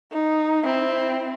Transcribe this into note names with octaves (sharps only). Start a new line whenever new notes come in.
D#4
C4 E4